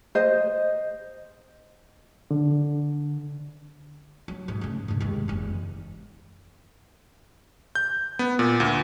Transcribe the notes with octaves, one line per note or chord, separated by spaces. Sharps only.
C5 D#5
D3
F#3
G#2
C#3 A3
G2 C3
D#2 G#3
F#1 E2
G6
B3
A#2
D2